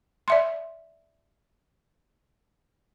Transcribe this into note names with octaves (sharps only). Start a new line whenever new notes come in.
D5 E5 C6